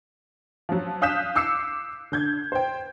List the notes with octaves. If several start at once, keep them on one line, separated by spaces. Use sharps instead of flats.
F3 F#3
F5 D#6 F#6 G6 B6 E7
D6 E6 C7 C#7 E7
D3 G6 G#6
C5 G5